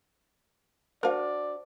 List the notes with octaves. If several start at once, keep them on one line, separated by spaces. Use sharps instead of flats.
D4 F#4 A#4 C5 D5 F5 A5